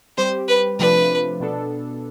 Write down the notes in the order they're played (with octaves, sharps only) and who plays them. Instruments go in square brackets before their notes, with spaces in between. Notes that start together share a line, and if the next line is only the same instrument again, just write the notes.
[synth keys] G3 C4 G4 [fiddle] C5
[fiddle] B4
[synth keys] C3 F3 A3 D4 [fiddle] B4
[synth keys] B2 B3 D4 A4